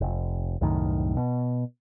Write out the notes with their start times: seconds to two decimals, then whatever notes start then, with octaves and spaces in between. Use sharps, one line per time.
0.01 F1
0.61 C2 F#2 A2 D#3
1.17 B2